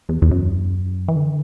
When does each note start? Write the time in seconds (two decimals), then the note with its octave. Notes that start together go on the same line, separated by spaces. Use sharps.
0.09 E2
0.22 E2
0.31 F#2
1.08 E3
1.16 D3